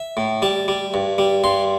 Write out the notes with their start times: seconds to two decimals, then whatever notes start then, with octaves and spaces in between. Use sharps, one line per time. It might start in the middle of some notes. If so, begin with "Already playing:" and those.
Already playing: E5
0.17 A2
0.42 G3 A5
0.68 G3
0.94 G2
1.18 G3
1.44 G2 C6